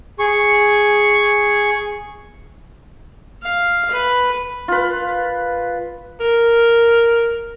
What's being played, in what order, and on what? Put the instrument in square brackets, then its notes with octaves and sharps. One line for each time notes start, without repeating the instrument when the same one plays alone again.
[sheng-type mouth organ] G#4 C#6
[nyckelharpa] F5
B4
[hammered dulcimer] F4 B4
[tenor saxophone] A#4